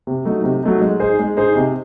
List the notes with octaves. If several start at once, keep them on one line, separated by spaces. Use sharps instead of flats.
C3
F#3 A3 D#4
C3
F#3 A3 D#4
G#3
D#4 G#4 C5
G#3
D#4 G#4 C5
C3